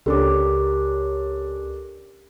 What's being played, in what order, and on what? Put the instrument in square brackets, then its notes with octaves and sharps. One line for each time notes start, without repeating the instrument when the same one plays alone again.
[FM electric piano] C#2 [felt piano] C#4 D4 A4 [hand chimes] G4 A#4 D6